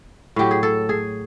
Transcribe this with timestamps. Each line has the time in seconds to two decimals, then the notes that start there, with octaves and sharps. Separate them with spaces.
0.36 A2 F#3 G4
0.51 G#4
0.63 A4
0.89 G#4